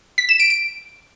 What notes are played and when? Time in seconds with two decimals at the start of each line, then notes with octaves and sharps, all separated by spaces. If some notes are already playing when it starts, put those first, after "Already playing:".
0.18 B6
0.29 E7
0.39 D7
0.50 D7